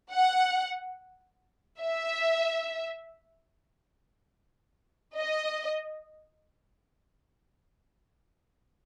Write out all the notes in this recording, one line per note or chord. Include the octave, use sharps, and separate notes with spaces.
F#5
E5
D#5